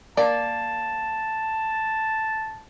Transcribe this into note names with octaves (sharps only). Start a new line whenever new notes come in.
A#3 D5 A5